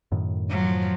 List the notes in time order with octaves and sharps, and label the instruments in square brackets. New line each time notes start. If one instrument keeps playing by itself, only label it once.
[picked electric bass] F#2 A2 D#3
[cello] F3 F#3